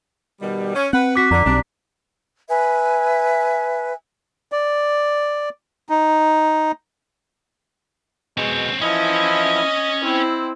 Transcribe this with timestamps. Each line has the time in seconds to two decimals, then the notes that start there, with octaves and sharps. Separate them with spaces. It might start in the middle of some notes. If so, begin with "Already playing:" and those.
0.40 B2 D#3 G3
0.75 C#4
0.93 C4 B4 F#5
1.16 F#4 D6 B6
1.31 F2 D3 A#5 D6
1.46 B1 G3 C4 D4
2.48 B4 E5 G#5
4.52 D5
5.89 D#4
8.38 B2 G#3 C4 C#5
8.81 E3 F3 C#4 E4 D#5
10.04 C4 E4